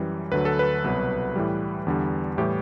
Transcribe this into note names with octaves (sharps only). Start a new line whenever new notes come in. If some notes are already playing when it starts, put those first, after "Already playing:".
Already playing: F#2 E3 G3
D2 D3 F#3 B4
A4
B4
C2 B2 F#3
A2 E3 G3
E2 D3 G3
A2 E3 G3 G4